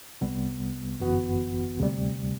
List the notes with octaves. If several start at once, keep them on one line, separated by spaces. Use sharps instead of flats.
C2 C3 G3 B3
G1 F#2 E3 B3 F#4
D2 C3 G3